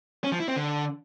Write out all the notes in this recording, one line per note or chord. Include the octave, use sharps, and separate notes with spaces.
C#4
F3
E4
C4
D3